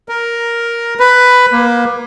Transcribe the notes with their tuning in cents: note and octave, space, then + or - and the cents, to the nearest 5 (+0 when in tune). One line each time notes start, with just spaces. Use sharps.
A#4 +5
B4 +10
A#3 +30